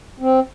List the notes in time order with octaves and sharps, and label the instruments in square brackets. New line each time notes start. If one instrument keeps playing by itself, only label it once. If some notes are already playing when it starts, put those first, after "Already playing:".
[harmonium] C4